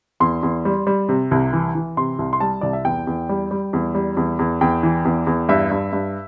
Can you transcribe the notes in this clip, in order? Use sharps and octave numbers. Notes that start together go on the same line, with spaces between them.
E2 C6
E2
G3
G3
C3
C2
E3
E3
C3 C6
C2
C6
G3 A5
C2 D5
E5
E2 G5
E2
G3
G3
E2
G3
E2
E2
E2 G5
E3
E2
E2
G2 E5
G2
G2